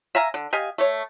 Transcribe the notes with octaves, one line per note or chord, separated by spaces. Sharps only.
E5 F5 G#5 A#5
D3
G4 D#5 F5 G#5
A3 C#5